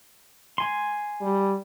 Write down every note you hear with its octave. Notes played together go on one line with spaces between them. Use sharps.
G#5 C6
G3